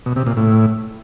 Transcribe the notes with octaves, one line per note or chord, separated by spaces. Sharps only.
B2
C3
A#2
A2